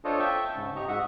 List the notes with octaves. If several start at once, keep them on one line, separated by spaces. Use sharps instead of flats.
D4 F4 A4 C5 C#5 D#5
E5 G5 A5 C#6
G#2 C#3
G4 D#5 A#5 C#6
G#2 F#4 D#5 E5 F#5